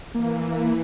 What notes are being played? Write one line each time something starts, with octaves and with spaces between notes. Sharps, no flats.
E3 A#3